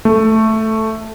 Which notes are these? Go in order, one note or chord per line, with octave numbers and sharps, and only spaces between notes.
A3